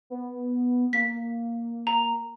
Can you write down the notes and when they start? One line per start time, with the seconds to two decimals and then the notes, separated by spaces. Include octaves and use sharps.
0.10 B3
0.93 A#3 B6
1.87 A#5